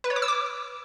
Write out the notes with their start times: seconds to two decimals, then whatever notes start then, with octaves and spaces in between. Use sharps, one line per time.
0.04 B4
0.10 C#5
0.16 D6
0.22 E6
0.28 D6